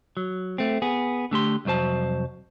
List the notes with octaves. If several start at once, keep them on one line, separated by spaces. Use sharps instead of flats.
F#3
A3 C4
B3 G#4
D3 A3 G4 C6
C2 F2 F#3 C5 A5